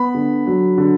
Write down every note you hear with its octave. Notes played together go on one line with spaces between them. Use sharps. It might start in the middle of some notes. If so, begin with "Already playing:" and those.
Already playing: B3 B5
D3
F#3
D3